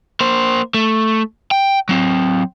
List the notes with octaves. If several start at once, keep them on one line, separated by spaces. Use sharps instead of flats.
A#3 C5
A3
G5
F#3 C4